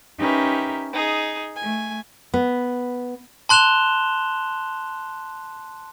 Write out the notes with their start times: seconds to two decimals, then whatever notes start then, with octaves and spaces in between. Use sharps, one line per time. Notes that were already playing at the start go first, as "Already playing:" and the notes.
0.17 C#4 D#4 G4 A#4 B4 E5
0.92 D#4 G#4
1.57 A3 G#5
2.34 B3
3.49 A5 C6 F#6 E7 F7 G7